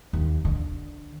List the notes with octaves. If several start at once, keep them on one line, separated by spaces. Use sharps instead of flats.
D#2
D3